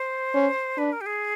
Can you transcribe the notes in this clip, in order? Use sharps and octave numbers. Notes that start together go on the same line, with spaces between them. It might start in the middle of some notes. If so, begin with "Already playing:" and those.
Already playing: C5
C#4
D4 B4
A#4
G4
G#4